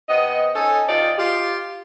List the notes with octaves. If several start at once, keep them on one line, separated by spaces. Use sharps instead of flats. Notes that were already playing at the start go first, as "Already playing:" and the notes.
C3 B3 D#5
C#4 D#4 A4
C3 D#4 F4 D5
F4 G4